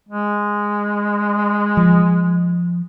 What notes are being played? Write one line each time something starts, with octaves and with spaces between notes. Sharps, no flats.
G#3
F3